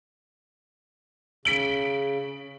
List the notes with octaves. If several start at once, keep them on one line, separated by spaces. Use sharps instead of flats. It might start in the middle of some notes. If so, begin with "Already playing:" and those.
C#3 B6 D7 F#7